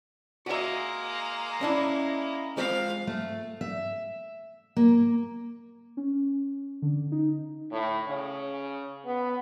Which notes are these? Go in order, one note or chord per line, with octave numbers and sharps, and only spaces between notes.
G#3 A#3 F#4 E5
C#4 D4 E4
F3 G#3 C4 F5
A3
E5
A#3
C#4
D3
D#4
A2
C#3
B3